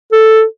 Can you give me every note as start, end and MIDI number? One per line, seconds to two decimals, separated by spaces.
0.13 0.44 69